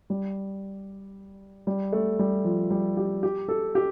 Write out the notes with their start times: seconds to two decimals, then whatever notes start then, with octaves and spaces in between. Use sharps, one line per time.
0.10 G3
1.67 G3
1.92 A3
2.19 G3
2.45 F3
2.70 G3
2.97 G4
3.23 G4
3.48 A4
3.75 G4